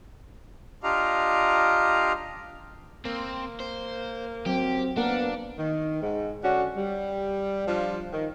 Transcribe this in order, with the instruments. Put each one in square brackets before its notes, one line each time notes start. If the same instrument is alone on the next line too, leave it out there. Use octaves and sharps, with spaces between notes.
[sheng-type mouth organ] D4 F4 G4 D#5 F5 A#5
[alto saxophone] A#3 [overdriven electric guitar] C4
[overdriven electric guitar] C5
[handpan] F#3 [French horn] C4 [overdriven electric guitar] G4
[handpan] A#3 A#4 [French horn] B3 [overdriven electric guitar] D4 [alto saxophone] F#5
[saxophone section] D#3
G#2
D3 C#4 D4 F#4
G3
F3 G3 D4 F4
D#3